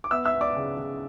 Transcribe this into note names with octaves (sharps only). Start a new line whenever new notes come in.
D6
B3 E5 E6
E5 E6
B3
D5 D6
C#3
C#3